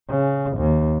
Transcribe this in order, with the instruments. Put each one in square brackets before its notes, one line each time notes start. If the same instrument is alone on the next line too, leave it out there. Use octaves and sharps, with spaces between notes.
[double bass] C#3
D#2